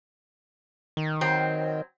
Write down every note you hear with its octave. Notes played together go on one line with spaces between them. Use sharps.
D#3
F#3 C4